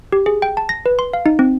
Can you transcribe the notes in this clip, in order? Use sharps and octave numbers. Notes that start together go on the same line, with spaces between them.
G4
G#4
G5
A5
A#6
B4
C6
F5
D#4
C4